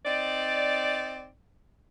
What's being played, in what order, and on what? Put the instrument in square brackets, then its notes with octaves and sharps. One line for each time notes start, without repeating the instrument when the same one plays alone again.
[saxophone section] C4 D#4 D5